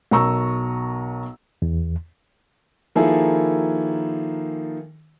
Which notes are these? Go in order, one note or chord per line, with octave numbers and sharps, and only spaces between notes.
B1 A#4 A#5 C#6 E6
E2
D#3 F3 A#3 E4 G#4 A4